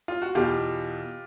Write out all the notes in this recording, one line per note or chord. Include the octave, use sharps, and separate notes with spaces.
F4
F#4
E2 B2 F4 G4